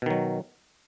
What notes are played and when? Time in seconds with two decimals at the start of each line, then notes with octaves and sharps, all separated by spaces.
0.02 B2
0.06 D#3
0.10 F#3